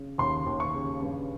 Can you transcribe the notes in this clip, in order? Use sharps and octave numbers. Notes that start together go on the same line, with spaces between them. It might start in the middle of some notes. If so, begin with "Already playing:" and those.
Already playing: C#3
D#2 C6
D#2
C#6
C#3
G2